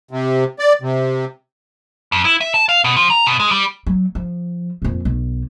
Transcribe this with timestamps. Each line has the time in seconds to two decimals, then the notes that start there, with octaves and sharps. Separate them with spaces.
0.11 C3
0.59 D5
0.82 C3
2.12 F2
2.25 E4
2.41 E5
2.54 A5
2.69 F5
2.84 B2
2.96 F3
3.10 A#5
3.26 B2
3.40 G#3
3.51 G3
3.86 F#3
4.15 F3
4.82 F2 A#2
5.05 B1